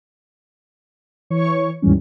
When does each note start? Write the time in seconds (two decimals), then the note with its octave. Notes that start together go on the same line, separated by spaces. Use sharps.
1.30 E3 C#5 C#6
1.82 D#2 G#2 D#3 E3 G3 C#4